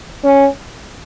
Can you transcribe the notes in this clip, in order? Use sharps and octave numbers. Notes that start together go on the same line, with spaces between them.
C#4